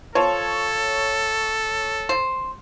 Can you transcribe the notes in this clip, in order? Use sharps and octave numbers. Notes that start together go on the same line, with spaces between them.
F3 A4 C#5
C5